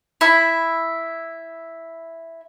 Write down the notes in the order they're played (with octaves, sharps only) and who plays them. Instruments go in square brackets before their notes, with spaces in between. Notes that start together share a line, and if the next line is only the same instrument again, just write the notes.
[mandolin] E4 E5